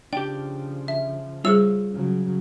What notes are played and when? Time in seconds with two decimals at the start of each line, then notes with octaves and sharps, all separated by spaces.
0.13 C#3 F3 D4 G4 G5
0.88 E5
1.45 G3 F4 G#4 C5 C#5 E6
1.92 C#3 F#3